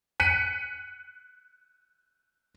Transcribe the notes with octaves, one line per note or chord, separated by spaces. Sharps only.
F#6 B6 C#7 D#7